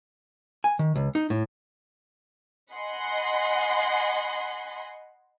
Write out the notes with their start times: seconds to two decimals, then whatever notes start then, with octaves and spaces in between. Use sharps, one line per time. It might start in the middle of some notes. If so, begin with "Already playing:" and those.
0.64 G#5
0.79 D#3
0.96 C#2
1.15 D#4
1.30 A2
2.74 D#5 F#5 G#5 B5 C6